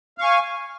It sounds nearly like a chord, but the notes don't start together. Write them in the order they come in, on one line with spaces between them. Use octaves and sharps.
F5 C#6 G#5